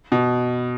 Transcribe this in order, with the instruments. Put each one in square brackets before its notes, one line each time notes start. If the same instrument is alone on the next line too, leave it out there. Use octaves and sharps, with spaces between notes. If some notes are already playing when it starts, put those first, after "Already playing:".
[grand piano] B2